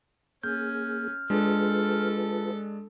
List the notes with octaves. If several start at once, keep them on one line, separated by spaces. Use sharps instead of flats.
A#3 C#4 G#4 F6 G6
G#3 D4 F4 G#4 A4 B4